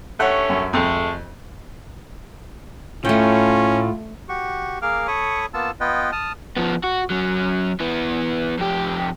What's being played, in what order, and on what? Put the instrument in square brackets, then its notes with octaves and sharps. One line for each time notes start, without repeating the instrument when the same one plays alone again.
[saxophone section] G2 A3 C#4 [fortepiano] F#5
[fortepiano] F#2
[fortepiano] F2 [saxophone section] G#3 A3
[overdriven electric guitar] A2 [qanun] A3 G5 [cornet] C#4 [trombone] F4
[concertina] F#4 G4 C#6
A#3 G#4 A#4 F5 D6 F6
A4 C#5 B5 C#6 D#6
A#3 B3 F4 A5 E6
B3 F4 B4 D#5 G5
A5 D#6 F6
[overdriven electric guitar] F3 B3
F#4
F#3 C#4
E3 B3
F2 G4